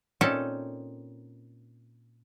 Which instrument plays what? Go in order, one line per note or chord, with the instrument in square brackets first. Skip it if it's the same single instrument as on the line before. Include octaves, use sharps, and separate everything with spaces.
[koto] A#2 C4 C#4 D#4 A4 A5